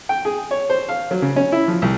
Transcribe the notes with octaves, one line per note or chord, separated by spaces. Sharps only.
G5
G#4
C#5
C5
F5
F#3
C#3
C#4
E4
F3
C2